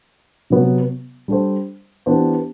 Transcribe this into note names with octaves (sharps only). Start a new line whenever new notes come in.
C3 F#3 B3
G3 D4 A4 C5
E3 B3 D4 G4 C5